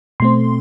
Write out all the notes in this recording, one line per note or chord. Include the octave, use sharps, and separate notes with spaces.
B2 A3 C4 C6